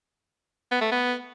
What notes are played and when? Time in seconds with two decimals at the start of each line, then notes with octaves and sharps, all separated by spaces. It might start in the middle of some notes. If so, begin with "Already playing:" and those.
0.71 B3
0.81 A3
0.92 B3